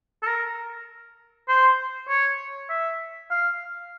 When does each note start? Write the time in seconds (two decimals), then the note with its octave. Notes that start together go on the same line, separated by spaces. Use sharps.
0.23 A4
0.27 A#4
1.48 C5
2.09 C#5
2.70 E5
3.31 F5